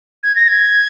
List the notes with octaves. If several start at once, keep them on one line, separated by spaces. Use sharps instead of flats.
G#6
A#6
G#6